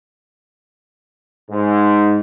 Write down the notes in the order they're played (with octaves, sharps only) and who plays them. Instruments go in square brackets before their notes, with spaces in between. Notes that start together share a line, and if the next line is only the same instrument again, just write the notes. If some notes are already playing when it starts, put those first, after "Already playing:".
[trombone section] G#2